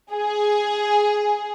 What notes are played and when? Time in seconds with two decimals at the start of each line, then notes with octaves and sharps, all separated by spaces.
0.13 G#4